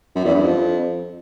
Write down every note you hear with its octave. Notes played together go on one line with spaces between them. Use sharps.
F#2
E2
G2
F2